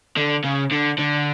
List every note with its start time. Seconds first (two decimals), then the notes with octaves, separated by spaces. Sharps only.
0.17 D3
0.45 C#3
0.72 D3
0.99 D3